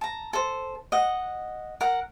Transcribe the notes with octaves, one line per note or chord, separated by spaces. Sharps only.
A5 A#5
A4 C5
D#5 F#5
A#4 F#5